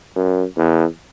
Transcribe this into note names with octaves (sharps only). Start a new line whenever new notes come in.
F#2
E2